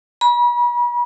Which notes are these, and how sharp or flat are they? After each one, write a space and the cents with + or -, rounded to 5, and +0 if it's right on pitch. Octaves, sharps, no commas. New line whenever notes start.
B5 -40